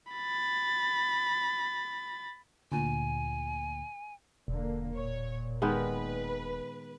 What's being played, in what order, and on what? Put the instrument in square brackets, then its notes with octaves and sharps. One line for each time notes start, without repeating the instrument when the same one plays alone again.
[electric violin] B5 A6
[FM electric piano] D2 A#2 [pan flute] G#5
[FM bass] E1 [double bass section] D3 A#3
[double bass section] A#2 [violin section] C#5
[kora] D#3 G#3 B3 [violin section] B4